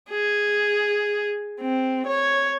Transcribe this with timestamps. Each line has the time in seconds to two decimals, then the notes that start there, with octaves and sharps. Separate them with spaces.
0.10 G#4
1.61 C4
2.07 C#5